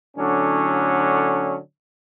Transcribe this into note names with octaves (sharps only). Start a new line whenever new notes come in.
A2 D3 F#3 C#4 D4